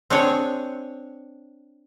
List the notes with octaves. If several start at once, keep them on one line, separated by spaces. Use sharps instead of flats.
C4 D4 G#4 C#5 F#5 G#5